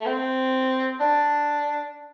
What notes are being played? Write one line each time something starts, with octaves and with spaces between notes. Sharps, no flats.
A3
C4
D4